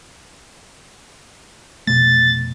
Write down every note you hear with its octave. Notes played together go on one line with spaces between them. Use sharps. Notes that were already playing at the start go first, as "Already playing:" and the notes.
F1 B2 A3 A6